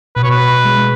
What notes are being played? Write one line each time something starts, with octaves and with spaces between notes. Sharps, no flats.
B2 B4
C#5
B4
B2
G#3